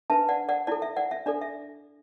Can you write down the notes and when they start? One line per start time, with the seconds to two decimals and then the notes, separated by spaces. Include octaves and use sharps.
0.10 D4 B4 E5 A5
0.28 D5 F#5
0.49 D5 F#5
0.67 E4 A4 D5
0.82 E5
0.97 D5 F#5
1.11 E5
1.26 D4 A4 D5
1.41 E5